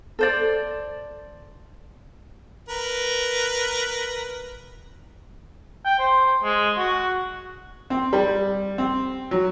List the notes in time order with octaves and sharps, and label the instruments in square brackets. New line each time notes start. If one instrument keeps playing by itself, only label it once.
[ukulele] A4 C5 D5
[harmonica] A#4 B4
[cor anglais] G5
C5
G#3
F#4
[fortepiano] C4
G3
C4
F#3